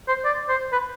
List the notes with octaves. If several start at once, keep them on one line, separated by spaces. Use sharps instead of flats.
C5
D5
C5
B4